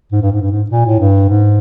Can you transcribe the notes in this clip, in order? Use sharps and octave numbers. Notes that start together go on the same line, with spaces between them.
G#2
G2
G#2
G2
G#2
A#2
A2
G2
G#2